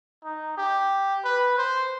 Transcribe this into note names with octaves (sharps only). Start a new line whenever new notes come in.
D#4
G4
B4
C5